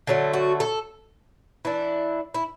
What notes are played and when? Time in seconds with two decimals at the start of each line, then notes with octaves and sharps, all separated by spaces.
0.07 D3 F#3 A3
0.33 F#4
0.60 A4
1.65 E3 D4 E4
2.34 E4